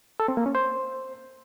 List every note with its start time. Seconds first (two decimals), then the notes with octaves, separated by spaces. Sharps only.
0.20 A4
0.28 C4
0.37 A#3
0.46 C#4
0.55 C5